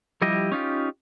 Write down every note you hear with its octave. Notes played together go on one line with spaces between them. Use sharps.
F3 G3 E4 G4 D#5
C#4 D#4 F4 G4